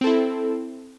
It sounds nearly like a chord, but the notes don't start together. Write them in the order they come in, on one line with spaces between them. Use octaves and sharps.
C4 A4 E4